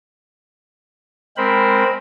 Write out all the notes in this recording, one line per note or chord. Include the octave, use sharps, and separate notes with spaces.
G#3 C4 A#4 C5 B5